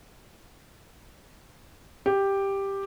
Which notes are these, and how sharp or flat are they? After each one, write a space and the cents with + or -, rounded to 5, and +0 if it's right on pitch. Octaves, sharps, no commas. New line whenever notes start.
G4 +5